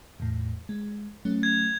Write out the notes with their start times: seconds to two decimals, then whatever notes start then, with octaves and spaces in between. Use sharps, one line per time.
0.20 E2 A2
0.69 G#3
1.25 F#3 A3 C#4
1.43 G#6